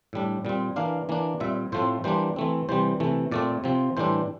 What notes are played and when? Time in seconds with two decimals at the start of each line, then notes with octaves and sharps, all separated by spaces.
0.13 A2 G3 D4
0.45 A#2 G3 C4
0.76 E3 A#3 D4 F5
1.09 E3 A#3 D4
1.40 A#2 G3 C4 E5
1.72 A2 F3 A3 C4 C5
2.04 E3 G3 A#3 D4 C5
2.36 E3 A3 C4
2.69 C3 E3 G3 C5
3.00 C3 E3 A3
3.32 A#2 A3 C4 D5
3.64 C3 F3 C4
3.97 A2 E3 G3 D4 C5